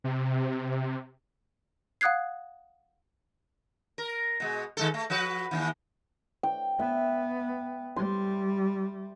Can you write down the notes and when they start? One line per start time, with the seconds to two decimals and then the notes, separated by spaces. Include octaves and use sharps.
0.04 C3
2.01 F5 F#5 D#6 F#6 G#6 C7
3.98 A#4
4.40 B2 G#3
4.77 D#3 G#3 A4
4.94 A3
5.10 F3 F#4 B4
5.51 D#2 C3 E3
6.43 G5
6.79 B3 E5
7.96 G3 C6